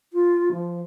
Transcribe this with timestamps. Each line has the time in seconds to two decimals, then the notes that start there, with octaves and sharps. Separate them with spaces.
0.13 F4
0.52 F3